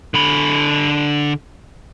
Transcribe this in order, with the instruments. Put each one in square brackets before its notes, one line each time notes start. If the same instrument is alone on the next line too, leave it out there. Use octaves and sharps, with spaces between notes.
[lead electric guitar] D3 B5